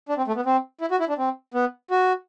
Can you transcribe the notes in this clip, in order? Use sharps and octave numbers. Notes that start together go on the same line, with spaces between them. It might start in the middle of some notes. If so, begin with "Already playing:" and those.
D4
C4
A3
B3
C4
E4
F#4
E4
D4
C4
B3
F#4